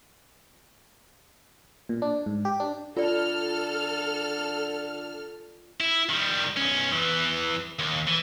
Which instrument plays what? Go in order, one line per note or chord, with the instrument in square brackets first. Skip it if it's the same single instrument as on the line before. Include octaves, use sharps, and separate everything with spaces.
[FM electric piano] A#2
D4
G#2
G4
D4
[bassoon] D3 [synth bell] F4 D5 [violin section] A4 F6
[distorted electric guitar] E4
D#3 G3
B1 C#4
E2 E3
D#2
E3